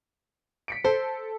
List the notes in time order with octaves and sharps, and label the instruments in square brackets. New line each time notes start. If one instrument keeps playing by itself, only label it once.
[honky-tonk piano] B6 C#7 D7
[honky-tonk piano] A4 [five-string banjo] C5